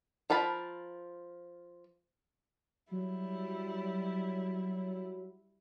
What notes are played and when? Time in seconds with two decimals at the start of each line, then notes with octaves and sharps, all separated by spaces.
0.30 F3 A#4 A5 B5
2.92 F#3 G3 E4